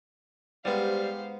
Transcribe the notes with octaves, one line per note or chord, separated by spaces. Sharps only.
G#2 G3 B3 G4 C5 F5